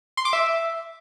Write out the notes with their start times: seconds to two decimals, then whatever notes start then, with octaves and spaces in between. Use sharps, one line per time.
0.17 C6
0.25 D6
0.33 E5